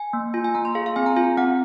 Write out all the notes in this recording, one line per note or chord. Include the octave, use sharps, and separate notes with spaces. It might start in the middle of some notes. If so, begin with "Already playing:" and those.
Already playing: G#5
A#3
F4 G#5
G#5
A#3 A#5
C6
G#4 F5
F5
C4 G#5
A#5
F4 G#5
C4 F#5